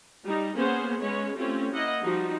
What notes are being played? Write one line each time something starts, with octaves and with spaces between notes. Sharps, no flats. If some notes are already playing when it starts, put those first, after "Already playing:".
G3 D#4
A#3 B3 C#4 G#4 C5 F#5
G#3 C#4 B4 C#5
A3 C4 C#4 F4 G4
A#3 E4 D#5 F#5
F3 G3 D#4 F#4